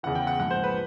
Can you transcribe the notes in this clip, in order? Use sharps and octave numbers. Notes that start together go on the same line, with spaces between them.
E2 C#3 E3 F#5
G5
F#5
A#1 G#2 F3 F#5
C5
B4